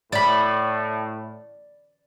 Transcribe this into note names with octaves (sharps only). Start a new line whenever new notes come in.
A2 D5 B5